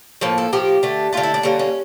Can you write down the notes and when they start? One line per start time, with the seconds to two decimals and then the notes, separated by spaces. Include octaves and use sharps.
0.21 A2 F3 A#3 C#5
0.38 A4
0.53 A2 F3 A#3 G4
0.83 D3 A3
1.13 D3 A3 F4
1.23 E4
1.34 D4
1.43 D3 G3 A#3 C#4
1.59 C#4